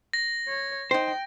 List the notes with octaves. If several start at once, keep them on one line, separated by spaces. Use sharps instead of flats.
A#6
C#5
D#4 C5 G5